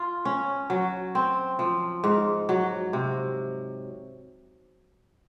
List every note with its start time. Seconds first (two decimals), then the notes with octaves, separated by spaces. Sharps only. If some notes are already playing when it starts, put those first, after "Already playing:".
Already playing: F4
0.25 C#4
0.70 F#3
1.15 C4
1.59 F3
2.04 G#2
2.49 F#3
2.93 C3